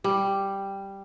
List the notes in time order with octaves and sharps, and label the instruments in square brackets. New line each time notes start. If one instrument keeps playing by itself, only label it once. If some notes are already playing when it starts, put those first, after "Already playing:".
[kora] G3